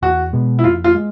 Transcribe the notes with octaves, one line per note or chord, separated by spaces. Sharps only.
E2 F#4
B2 G#3 B3
E4
F2 F4
F4
G#3